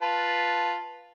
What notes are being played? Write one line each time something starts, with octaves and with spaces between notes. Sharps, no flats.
F4 B4 A5